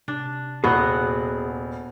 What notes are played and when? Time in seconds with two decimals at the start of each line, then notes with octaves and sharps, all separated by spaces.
0.08 C3 D4
0.64 D#1 B3 F#4 G#4 F#6